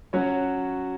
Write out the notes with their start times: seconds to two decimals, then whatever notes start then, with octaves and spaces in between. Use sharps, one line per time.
0.13 F#3 C#4 F#4 C#5